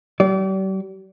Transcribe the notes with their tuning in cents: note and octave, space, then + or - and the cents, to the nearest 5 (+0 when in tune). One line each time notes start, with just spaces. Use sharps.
G3 -40 D5 -30